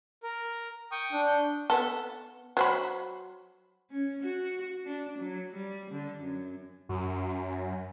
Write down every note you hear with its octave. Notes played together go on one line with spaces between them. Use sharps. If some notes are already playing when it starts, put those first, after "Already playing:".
A#4
G5 C#6 D#6
D4
G6
B3 A4
F#3 C5 B5
C#4
F#4
D4
F#3
G3
D3
F#2
F#2